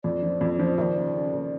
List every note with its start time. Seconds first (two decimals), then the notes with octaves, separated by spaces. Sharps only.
0.04 F2 D5
0.22 F3
0.41 F2
0.59 F3
0.77 D#2 D5 E5
0.95 C#3
1.14 C#3
1.33 D#2